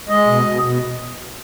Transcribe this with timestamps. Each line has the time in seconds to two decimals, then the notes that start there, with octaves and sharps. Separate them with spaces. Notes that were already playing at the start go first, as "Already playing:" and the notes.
0.09 G#3 D#5
0.27 B2
0.46 B2
0.63 B2